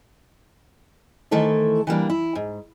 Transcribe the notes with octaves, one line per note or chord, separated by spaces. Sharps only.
D#3 E3 A3 E4 A4 C5
E3 G3 A#3 D4
E4
G#2